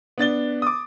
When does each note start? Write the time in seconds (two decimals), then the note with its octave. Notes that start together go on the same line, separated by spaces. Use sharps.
0.18 B3 D4 A6 G7
0.62 D6 D#6